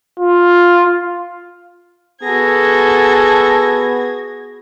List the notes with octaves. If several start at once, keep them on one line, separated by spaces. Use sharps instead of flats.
F4
B3 F#4 G#4 A4 G#6 A#6